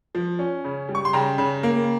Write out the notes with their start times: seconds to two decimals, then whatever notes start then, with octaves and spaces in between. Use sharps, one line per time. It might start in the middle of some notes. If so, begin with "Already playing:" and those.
0.15 F3
0.39 C#4
0.64 C#3
0.89 G3
0.95 C#6
1.05 C6
1.13 C#3 G5 A#5
1.38 C#3
1.63 A#3